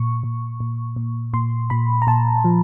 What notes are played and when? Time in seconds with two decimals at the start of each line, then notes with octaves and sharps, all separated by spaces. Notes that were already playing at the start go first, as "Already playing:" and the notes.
Already playing: A#2 C#6
0.23 A#2
0.60 A#2
0.96 A#2
1.33 A#2 C6
1.70 A#2 B5
2.02 A#5
2.07 A#2 A5
2.44 F3